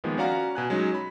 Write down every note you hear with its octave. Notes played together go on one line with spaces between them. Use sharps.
D#3 F3 G#3 A#3 B3
C#4 F#4 D5 F5 F#5 A#5
B2 G#5 F#6
F#3 G#3 C#4 D#4
B5